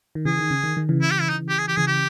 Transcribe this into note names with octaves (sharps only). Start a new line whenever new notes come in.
D#3
C#3 E3 G#4
D#3
C#3
D#3
D#3
C#3 E3
E4
G4
E4
D#4
G4
G#4
G4
C#3 E3 G#4
G4